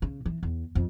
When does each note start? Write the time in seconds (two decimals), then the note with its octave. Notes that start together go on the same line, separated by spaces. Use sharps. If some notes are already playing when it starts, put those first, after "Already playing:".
0.02 C#3
0.26 E3
0.43 E2
0.75 F2